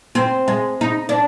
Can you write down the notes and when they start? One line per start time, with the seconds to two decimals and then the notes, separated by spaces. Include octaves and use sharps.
0.15 C4
0.48 G#3
0.81 D#4
1.09 D4